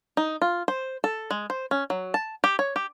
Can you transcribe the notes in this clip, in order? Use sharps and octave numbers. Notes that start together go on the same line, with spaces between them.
D#4
F4
C5
A4
G#3
C5
C#4
F#3
A5
G4
C#5
G4